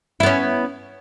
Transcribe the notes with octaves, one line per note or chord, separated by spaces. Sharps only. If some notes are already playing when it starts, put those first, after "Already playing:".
B3 C#4 E4